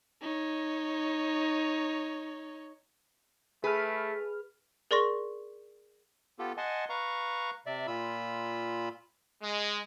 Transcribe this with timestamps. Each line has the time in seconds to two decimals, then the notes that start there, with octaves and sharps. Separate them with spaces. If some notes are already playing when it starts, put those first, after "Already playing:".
0.21 D#4 C#5
3.64 A3 G#4 B4 F6
4.91 G#4 A#4 D5 C6 C#6 A#6
6.39 B3 F4 G4 A4
6.57 D#5 F#5 G#5 A5 C6
6.89 B4 F5 A#5 C#6
7.66 C3 D5 E5
7.87 A#2 F4 B5 E6
9.42 G#3